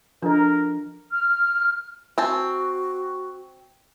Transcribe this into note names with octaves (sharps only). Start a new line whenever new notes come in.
F3 D4 A4 A#4 D#5
F6
C4 F#4 G#5 A5